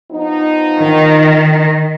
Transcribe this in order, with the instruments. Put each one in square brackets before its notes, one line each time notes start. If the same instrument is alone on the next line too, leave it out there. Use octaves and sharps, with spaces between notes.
[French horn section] F3 B3 D#4
[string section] D#3